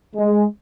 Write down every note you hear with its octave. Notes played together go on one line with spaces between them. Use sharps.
G#3